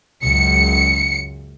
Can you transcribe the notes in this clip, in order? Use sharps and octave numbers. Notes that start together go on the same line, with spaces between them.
C#2 F#2 C#7